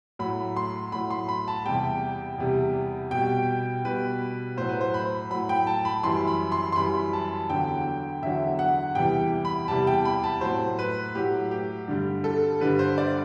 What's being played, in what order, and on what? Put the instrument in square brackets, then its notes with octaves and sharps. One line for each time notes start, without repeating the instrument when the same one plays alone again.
[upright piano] A2 F#3 B5
C6
A2 F#3 B5
C6
B5
A5
E2 C3 G3 G5
E2 C3 G3
B2 G3 G5
B2 G3 B4
A2 F#3 C5
B4
C5
B5
A2 F#3 B5
G5
A5
B5
F#2 E3 G3 C6
B5
C6
C6
F#2 E3 G3 B5
A5
E2 D3 F#3 G5
E2 D3 F#3 E5
F#5
E2 C3 E3 G3 G5
B5
E2 C3 E3 G3 A5
G5
B5
A5
A2 F#3 C5
B4
A2 F#3 G4
G4
G2 D3 G3
A4
G2 D3 G3 B4
C5
D5